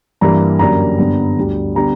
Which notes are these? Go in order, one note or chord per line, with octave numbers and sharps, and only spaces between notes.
G2 E3 G3 A#3 A#5
F#2 D3 G3 A#3 A#5
G2 D3 G3 B3
D2 D3 G3
D3 G3 B3 A#5